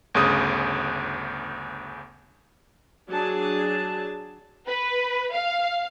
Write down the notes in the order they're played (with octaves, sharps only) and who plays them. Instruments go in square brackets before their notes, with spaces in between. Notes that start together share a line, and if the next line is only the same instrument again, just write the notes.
[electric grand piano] G1 D2 C#3 D#6
[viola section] F#3 D4 G#4 A5
[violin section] B4
F5